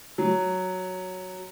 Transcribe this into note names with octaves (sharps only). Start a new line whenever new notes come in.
F#3